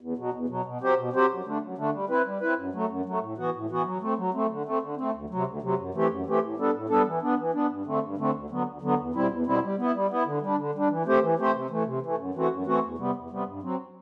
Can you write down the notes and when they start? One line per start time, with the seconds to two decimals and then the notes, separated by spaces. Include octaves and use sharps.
0.01 E2
0.17 B2 F#3
0.33 E2
0.48 B2 F#3
0.65 B2
0.81 F#3 C4 G4 C5
0.97 B2
1.13 F#3 C4 G4 C5
1.29 F#2
1.45 D3 A3 D4
1.62 F#2
1.78 D3 A3 D4
1.93 G3
2.09 C4 E4 B4
2.26 G3
2.41 C4 E4 B4
2.57 F#2
2.73 F#3 A3
2.89 F#2
3.05 F#3 A3
3.21 A2
3.37 E3 B3 F#4
3.54 A2
3.70 E3 B3 F#4
3.85 F#3
4.01 A3 C4
4.17 F#3
4.34 A3 C4
4.50 D3
4.65 A3 C4
4.82 D3
4.97 A3 C4
5.13 D2
5.30 C3 F#3
5.46 D2
5.62 C3 F#3
5.78 F#2
5.94 E3 A3 C4 G4
6.10 F#2
6.26 E3 A3 C4 G4
6.42 A2
6.57 G3 B3 D4 A4
6.74 A2
6.89 G3 B3 D4 A4
7.06 E3
7.22 B3 D4
7.38 E3
7.54 B3 D4
7.70 G2
7.85 D3 A3 C4
8.02 G2
8.18 D3 A3 C4
8.34 D2
8.50 D3 F#3 B3
8.65 D2
8.82 D3 F#3 B3
8.99 E2
9.14 B2 G3 C4 E4
9.31 E2
9.46 B2 G3 C4 E4
9.63 G3
9.78 B3 E4
9.94 G3
10.10 B3 E4
10.26 D3
10.42 G3 D4
10.58 D3
10.75 G3 D4
10.90 E3
11.06 A3 C4 G4 C5
11.22 E3
11.38 A3 C4 G4 C5
11.54 C3
11.70 E3 A3
11.86 C3
12.02 E3 A3
12.18 F#2
12.34 E3 A3 C4 F#4
12.51 F#2
12.66 E3 A3 C4 F#4
12.83 E2
12.98 C3 G3 B3
13.15 E2
13.30 C3 G3 B3
13.47 G2
13.62 F#3 C4